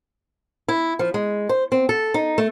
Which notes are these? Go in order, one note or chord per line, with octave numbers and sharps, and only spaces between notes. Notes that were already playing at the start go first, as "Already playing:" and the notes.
E4
F3
G#3
C5
C4
A4
D#4
A3